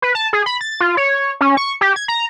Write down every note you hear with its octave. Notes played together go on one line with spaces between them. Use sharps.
B4
A5
G#4
B5
A6
F4
C#5
C#4
C#6
G4
G#6
A#5